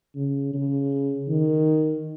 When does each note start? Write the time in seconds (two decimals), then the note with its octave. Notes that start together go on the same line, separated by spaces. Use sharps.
0.16 C#3
0.54 C#3
1.29 D#3